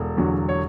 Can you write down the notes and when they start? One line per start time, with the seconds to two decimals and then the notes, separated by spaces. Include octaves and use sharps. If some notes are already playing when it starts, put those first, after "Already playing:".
Already playing: E1 A4
0.17 E2 D3 F#3
0.49 C#5